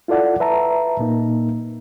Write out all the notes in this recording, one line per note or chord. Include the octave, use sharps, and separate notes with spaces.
E4 F4 A4 D5 F#5
B4 E5 A5 A#5
A#2 A#3 D#4